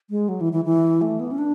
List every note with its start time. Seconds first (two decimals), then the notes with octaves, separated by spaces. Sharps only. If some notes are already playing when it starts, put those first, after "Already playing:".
0.10 G#3
0.29 F#3
0.41 E3
0.53 E3
0.65 E3
1.02 A3
1.20 B3
1.31 C#4
1.38 D4